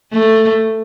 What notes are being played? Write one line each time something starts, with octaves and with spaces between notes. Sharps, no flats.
A3